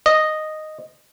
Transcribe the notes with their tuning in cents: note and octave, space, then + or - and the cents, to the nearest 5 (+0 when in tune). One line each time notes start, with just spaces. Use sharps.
D#5 -5